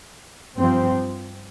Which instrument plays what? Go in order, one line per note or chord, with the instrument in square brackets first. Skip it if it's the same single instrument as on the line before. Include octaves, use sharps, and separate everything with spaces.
[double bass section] G2 F3 C4